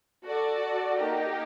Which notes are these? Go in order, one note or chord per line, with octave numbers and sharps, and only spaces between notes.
F#4 A4 D5
A#3 D#4 G4 A#4 D#5